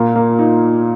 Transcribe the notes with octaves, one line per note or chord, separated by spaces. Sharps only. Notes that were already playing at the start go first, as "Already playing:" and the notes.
Already playing: A#2 A#3
A#3
D#4